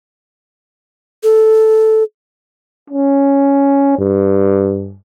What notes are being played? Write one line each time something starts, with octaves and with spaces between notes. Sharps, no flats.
A4
C#4
G2